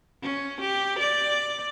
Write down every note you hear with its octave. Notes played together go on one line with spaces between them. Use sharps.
C#4
G4
D5